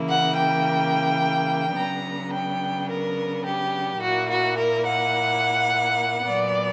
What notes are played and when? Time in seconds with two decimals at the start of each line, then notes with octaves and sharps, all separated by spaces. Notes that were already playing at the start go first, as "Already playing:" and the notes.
Already playing: C#3 E3 A#3 E4
0.08 F#5
0.37 G5
1.76 C#3 F#3 B3 D4 A#5
2.32 G5
2.89 A#4
3.44 G4
4.00 A#2 A#3 E4 F#4
4.28 F#4
4.56 A#4
4.85 F#5
6.25 A#2 F#3 B3 D5